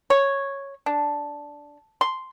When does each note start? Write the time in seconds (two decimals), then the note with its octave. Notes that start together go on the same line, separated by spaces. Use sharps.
0.10 C#5
0.86 D4
2.01 C6